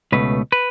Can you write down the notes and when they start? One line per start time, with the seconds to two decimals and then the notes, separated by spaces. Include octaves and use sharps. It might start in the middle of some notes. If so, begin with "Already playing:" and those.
0.12 C#2 B2 A3 B4
0.52 B4